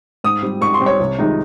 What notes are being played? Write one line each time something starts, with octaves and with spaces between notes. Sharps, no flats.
G#2 D#6
G3 C4 G4
G#2 C#6
C6
G3 C4 G4
C#5
C2
C3 D#3 G#3 D#4